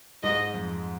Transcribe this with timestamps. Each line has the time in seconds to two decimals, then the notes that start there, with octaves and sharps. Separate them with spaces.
0.23 G#2 D#5
0.54 F2